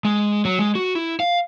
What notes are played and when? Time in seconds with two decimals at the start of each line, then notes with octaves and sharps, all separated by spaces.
0.05 G#3
0.45 F#3
0.59 G#3
0.75 F#4
0.95 E4
1.20 F5